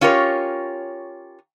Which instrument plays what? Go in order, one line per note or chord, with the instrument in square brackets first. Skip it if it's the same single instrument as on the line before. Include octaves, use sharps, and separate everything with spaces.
[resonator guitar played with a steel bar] C#4 F4 G4 A#4 C#5